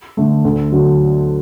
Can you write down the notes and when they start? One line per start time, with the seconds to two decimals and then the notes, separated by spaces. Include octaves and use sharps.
0.17 D3 A3
0.45 D2
0.72 D3 F#3